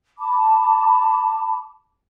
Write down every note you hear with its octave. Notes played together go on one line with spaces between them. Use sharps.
A5 B5 D6